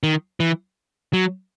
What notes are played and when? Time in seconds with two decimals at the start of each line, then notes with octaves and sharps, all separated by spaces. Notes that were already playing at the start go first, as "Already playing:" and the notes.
0.03 D#3
0.40 E3
1.13 F#3